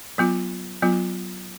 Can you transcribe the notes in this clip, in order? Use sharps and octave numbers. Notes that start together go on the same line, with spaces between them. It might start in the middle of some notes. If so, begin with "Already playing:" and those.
F#3 B3 F4
F#3 B3 F4